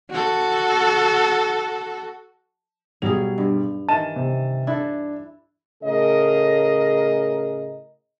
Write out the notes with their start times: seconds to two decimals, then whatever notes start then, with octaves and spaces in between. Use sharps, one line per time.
0.10 F#4 A4
3.02 B1 F#3 G3 G#4 F7
3.38 G2
3.89 D#3 E3 A5 A6 D#7 E7
4.16 C3
4.67 D4 E4 A4
5.84 A2 C#3 A3 G#4 A#4 D#5